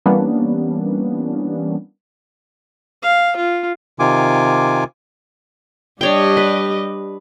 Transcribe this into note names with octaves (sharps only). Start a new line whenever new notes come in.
E3 G3 A#3 B3 C#4 D4
F5
F4
C3 D#3 F4 G#5 D6
G3 D4 G4 C#5 D#5 G5
B4